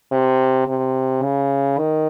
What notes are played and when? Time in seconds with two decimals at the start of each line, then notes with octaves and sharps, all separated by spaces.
0.12 C3
0.68 C3
1.23 C#3
1.78 D#3